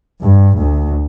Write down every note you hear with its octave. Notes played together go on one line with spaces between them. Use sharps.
G2
D2